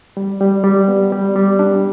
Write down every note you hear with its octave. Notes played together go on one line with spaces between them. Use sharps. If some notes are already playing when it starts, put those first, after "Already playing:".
G3
G3
G3
B3
G3
G3
D4